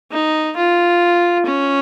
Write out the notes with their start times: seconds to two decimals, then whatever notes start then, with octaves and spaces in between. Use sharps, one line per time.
0.12 D#4
0.57 F4
1.46 C#4